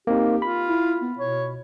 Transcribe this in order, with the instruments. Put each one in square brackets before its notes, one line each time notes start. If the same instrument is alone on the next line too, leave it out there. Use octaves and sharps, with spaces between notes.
[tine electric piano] A#3 C4 D#4 [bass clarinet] G4
[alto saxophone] F4 [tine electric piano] B5
[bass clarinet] E4
B3
[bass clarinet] B2 [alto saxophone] C#5